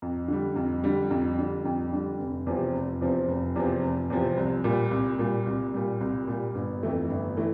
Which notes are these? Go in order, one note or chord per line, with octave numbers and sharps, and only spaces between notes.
F2
D3 G3
F2
D3 G3
F2
D3 G3
F2
D3 G3
F1
E2 C3 F3 C4
F1
E2 C3 F3 C4
F1
E2 C3 F3 C4
F1
E2 C3 F3 C4
C2
A#2 G3
C2
A#2 G3
C2
A#2 G3
C2
A#2 G3
G1
F2 E3 A3 E4
G1
E3 A3 E4